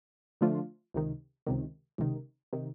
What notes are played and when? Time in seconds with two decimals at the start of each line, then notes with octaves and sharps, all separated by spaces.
0.41 D3 F3 A3 D4 F4
0.94 C#2 C3 D#3
1.47 C#2 C3 D#3
1.98 C#2 C3 D#3
2.53 C3 D#3